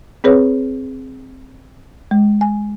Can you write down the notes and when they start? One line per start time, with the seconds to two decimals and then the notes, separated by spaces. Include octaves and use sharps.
0.24 C4 G#4 B4 C#5
2.11 G#3
2.41 G#5